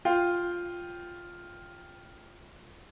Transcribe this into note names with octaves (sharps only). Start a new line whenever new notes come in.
F4 G5